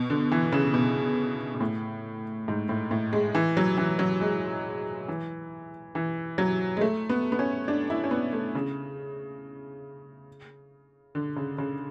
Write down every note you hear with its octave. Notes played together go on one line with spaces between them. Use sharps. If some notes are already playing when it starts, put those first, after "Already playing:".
Already playing: B2
D3
E3
C#3
B2
B2
A2
G#2
A2
A2
G#3
E3
F#3
E3
F#3
G#3
E3
E3
F#3
G#3
A3
B3
B3
C#4
D4
E4
C#4
B3
A3
C#3
D3
C#3
C#3